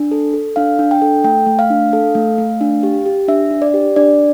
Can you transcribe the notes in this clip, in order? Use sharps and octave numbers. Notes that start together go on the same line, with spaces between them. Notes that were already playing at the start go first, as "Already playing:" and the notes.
Already playing: D4
A4
A4
D4 F5
D4
G5
A4
A3 G5
A3
F5
D4
A4
A3
A3
D4
G4
G4
D4 E5
D4
D5
G4
D4 D5